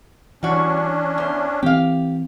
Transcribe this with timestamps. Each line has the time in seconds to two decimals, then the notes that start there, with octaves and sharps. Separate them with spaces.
0.43 E3 G3 C#4 D4 F#4
1.18 E2 C5
1.63 E3 C4 G4 F5